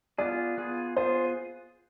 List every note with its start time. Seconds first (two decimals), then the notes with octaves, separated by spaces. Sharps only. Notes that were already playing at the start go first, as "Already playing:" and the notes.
0.18 B3 F4 G#4 D5
0.58 B3 F4 G#4
0.97 B3 F4 G#4 C5